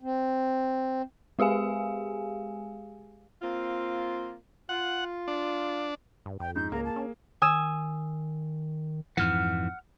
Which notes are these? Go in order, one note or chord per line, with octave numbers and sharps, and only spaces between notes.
C4
G#3 G4 G#4 F5 G#5
A#3 C4 F4
F4 F#5
D4
G2
F2 G5
G#2 G6
C#2 A#3 G#4 A#5
A5
C#4
D#3 G#5 D#6 E6
F2 G#2 E3 F#5 F6